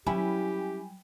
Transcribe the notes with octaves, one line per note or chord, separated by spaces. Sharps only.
F#3 G3 C#4 E4 G4 G5 G#5 B5